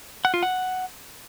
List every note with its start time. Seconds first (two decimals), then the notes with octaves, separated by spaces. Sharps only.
0.25 F#5
0.34 F4
0.43 F#5